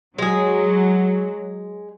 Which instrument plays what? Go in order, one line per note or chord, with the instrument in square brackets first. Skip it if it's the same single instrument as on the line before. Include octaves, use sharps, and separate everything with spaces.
[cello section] F#3 [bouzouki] G#3 G#4